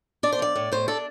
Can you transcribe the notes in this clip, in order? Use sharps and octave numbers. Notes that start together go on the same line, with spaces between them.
D4 D5
C5
F3 D5
A2
A2 C5
D4 A4